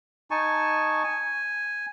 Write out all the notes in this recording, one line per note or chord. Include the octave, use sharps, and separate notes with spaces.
D#4 G#5 A5 C#6
G#5